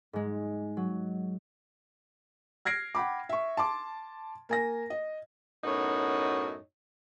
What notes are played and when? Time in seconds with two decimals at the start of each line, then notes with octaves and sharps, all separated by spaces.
0.13 G#2 G#3
0.77 F#3
2.65 F6 G#6 A#6 C7 D7
2.95 F#5 G5 B5 D6
3.29 E5 C#6
3.57 A5 C6 D6
4.49 A#3 G#5 A#6
4.90 D#5
5.63 F#2 A2 B3 D#4 F#4 C#5